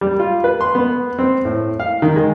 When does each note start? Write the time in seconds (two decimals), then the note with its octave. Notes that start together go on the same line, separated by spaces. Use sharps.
0.01 G3
0.19 F4
0.44 B4
0.61 C6
0.75 B3
1.19 C4
1.45 A2
1.80 F5
2.02 D#3
2.16 G#3